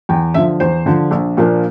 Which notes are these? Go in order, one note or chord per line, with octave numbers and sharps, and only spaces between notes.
E2 G5
D3 F3 E5
E2 C5
D3 F3
A#1
A#2 F3 A#3 D4